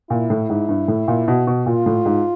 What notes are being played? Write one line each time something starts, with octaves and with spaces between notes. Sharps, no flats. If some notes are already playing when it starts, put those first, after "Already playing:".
A#2 E4
A2
G#2
G2
A2
A#2
B2
B2
A#2 F4
A2
G#2